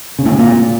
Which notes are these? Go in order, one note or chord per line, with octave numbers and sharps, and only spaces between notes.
C#3
A2
C#3
A#2